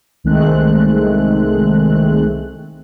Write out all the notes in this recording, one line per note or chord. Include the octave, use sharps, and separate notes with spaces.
C2 D#3 G#3 A3 C4 F#6